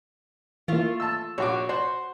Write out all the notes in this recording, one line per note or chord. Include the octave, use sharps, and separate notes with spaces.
E3 A3 A#3 F4
A5 E6
A#1 F#4 C#5 D6
F#4 C5